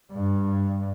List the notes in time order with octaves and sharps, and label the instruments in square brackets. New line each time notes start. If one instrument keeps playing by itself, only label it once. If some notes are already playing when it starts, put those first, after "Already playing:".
[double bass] G2